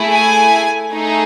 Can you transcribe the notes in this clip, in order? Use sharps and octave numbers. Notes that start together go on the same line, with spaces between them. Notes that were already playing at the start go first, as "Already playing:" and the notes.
Already playing: A3 E4 G#4
G#5
A3 D#4 G#4